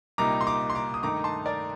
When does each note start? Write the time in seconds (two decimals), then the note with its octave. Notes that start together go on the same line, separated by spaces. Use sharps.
0.18 C2 A#2 G3 A#3 D#4 A#5 D6
0.41 C6
0.47 A#5 D6
0.70 C6
0.75 A#5 D6
0.94 D#6
1.03 G2 D#3 A3 D#4 A#5 D6
1.24 A5 C6
1.46 A#4 D5